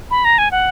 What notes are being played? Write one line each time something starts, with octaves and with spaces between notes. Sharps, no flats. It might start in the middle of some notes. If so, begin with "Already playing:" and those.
B5
A#5
G#5
F#5